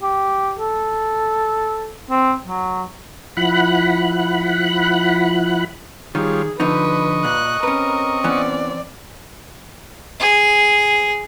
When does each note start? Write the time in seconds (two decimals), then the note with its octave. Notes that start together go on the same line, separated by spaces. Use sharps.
0.03 G4
0.60 A4
2.10 C4
2.47 F#3
3.37 F3 E4 F#5 B5 F#6
6.15 D#3 G3 F4 G#4 C#5
6.60 D3 F3 D#4 B4 D#5 C#6
7.24 A#2 F#6
7.63 C4 C#4 A#4 B4
8.24 E3 B3 C#4 D5
10.20 G#4